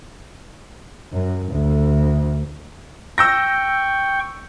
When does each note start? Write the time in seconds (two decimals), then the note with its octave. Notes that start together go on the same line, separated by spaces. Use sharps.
1.13 F#2
1.52 D2
3.18 G5 C#6 E6 G6 A#6